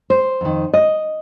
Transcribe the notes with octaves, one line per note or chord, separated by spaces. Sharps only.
C5
F2 D#3
D#5